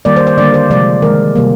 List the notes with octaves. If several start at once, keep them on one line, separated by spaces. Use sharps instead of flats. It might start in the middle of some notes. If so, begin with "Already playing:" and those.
D#3 G3 A#3 D5
C5
C5
D3 G3 A#3 D5
C5
C3 F3 G#3 D5
D#3 G#3 A#4
C3 G3 A#3